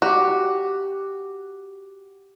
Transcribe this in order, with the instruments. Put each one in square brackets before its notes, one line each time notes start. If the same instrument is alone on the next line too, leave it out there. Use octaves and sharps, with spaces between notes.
[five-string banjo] F#4 [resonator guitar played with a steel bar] G4